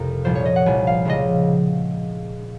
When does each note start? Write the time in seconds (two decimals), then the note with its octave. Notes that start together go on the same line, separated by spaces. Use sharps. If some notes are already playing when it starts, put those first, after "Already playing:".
Already playing: C2 F2 C3 A#4
0.25 C2 A#2 F3 C5
0.35 C#5
0.45 D#5
0.56 F#5
0.66 C2 A#2 F3 G#5
0.87 F5
1.05 C#2 C#3 F3 D#5